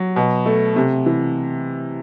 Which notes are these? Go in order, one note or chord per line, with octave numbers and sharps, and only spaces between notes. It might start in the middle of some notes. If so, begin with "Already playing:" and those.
Already playing: F#3
B2
A3
C3
E3